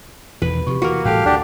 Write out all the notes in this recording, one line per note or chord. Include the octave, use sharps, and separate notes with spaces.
E2 B2 D#3 B4
C3 F3 G4 C#6
E3 A#3 F#4 A#4
A2 E3 G3 G4 A4 F5 A5 F#6
D2 D4 G4 F#5 D6